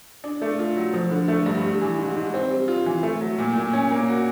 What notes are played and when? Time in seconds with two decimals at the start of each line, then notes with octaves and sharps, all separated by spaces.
0.24 D4
0.42 A3
0.59 F4
0.76 F#3
0.93 F3
1.11 D3
1.28 A3
1.46 G2
1.64 G3
1.81 E3
1.99 G#2
2.16 G#2
2.34 C4
2.50 G3
2.68 F4
2.86 E3
3.03 A3
3.21 F#3
3.38 A#2
3.56 A#2
3.73 C#4
3.90 A#3
4.08 F#4